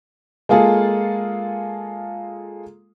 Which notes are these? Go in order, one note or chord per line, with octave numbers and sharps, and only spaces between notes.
G#3 A#3 F4 G#4 A4